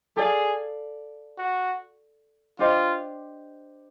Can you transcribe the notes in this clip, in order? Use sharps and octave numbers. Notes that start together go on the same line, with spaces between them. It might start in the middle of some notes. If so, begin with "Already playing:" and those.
G#4 A4 D5 F5
F#4
D4 F4 G4 C5 D#5